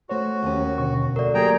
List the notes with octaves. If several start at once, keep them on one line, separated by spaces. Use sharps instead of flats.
A3 F#4 C5 C#5
D#2 C#4
B2 D3 C#6
D2 A#4 D5
F#3 A#3 G4 G#4 G5 A#5